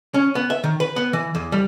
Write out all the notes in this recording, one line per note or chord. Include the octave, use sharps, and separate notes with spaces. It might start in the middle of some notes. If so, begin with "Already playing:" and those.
C#4
B3
E5
D#3
B4
B3
E3
E2
G3